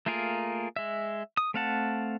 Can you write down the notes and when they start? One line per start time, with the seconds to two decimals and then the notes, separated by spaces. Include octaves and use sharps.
0.06 A3 A#3 F4 G#4 A#4
0.76 G#3 E5
1.37 D#6
1.54 A3 C4 F5 F#5 A5